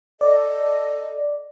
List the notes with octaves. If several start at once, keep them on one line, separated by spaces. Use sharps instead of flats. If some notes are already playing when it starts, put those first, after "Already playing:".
A4 D5 D#5